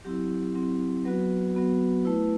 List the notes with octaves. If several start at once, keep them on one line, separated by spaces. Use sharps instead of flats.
F#3 C4 E4 G4
F#3 C4 E4
F#3 B3 F#4 B4
F#3 B3 F#4
A3 E4 B4